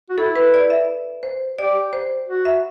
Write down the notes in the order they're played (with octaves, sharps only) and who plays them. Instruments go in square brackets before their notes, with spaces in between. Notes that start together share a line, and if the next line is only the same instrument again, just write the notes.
[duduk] F#4
[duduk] E4 [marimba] A4
[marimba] B4
D5
E5
C5
[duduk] G4 [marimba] D5
[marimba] C5
[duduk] F#4
[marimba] E5